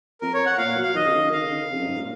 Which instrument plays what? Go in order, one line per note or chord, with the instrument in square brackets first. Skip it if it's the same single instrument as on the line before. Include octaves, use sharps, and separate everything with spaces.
[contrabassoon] F2 [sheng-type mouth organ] A#4
[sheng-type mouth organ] C#5
F#5
[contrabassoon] A#2 [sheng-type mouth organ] F5
[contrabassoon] F#3
[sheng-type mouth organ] F5
[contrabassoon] D#3 [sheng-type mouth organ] D#5
[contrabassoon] C#3
D#3
[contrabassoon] D#3 [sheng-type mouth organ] F5
[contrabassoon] C#3
D#3
C#3
F2
F#2
G#2
A#2